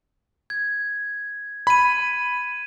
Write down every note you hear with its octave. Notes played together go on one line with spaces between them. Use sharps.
G#6
B5 G#6 D#7